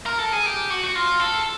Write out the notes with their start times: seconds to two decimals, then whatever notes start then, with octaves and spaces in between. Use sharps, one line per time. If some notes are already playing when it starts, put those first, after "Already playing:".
0.06 A#4
0.19 A4
0.33 G#4
0.46 G4
0.70 F#4
0.84 F#4
0.95 F4
1.20 A4